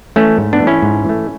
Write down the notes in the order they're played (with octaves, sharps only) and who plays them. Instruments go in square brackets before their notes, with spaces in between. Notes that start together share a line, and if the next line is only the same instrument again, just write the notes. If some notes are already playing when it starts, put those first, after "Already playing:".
[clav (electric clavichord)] E3 A3 C#4
G#2
B3 D4
E3 A3
C#4 E4
G#2
E3 A3